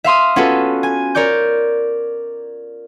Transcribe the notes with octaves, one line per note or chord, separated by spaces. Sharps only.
E5 F5 C6 D#6
B3 C#4 F4 F#4 A4 B4
G#5
A#4 C#5 D5 D6 G6